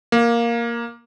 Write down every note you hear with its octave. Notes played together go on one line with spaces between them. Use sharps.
A#3